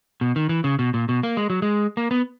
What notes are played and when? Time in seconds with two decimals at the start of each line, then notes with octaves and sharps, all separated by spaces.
0.21 B2
0.36 D#3
0.49 E3
0.64 C#3
0.79 B2
0.94 A#2
1.09 B2
1.23 A#3
1.37 G#3
1.50 F#3
1.62 G#3
1.97 A#3
2.11 B3